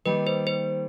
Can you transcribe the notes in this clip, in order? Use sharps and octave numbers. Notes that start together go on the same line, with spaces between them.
D#3 G3 A#3 B4
C5
C5